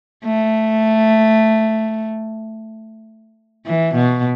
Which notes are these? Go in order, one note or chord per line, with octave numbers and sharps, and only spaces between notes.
A3
E3
B2